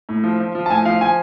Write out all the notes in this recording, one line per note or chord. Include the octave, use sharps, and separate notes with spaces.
A2
F3
F3
F3
A5
A2 G#5
F3 F5
F3 G#5